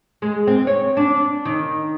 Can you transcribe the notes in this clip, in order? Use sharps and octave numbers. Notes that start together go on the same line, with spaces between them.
G#3
C4
C#5
D4
D#3